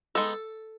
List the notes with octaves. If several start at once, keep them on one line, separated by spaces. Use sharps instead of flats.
G#3 B3 D#4 A4